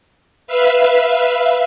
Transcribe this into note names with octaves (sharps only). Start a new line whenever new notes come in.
B4 E5 F5